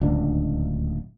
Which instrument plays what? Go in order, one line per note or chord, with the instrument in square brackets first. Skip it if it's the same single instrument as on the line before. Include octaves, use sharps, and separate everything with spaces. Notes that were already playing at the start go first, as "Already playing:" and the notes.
[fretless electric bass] D1 C#2 D4